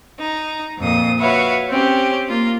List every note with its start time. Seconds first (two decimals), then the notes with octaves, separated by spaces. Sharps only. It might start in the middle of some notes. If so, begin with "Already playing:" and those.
0.19 D#4 A#5
0.78 F2 A#2 D#6
1.19 F#4 B4 C#5 E5 F5
1.68 C4 C#4 G4
2.28 A#3 F4